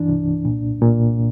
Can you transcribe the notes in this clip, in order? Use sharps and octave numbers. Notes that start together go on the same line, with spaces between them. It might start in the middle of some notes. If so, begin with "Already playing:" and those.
Already playing: G2 E3 D4
C2
A#2
A#2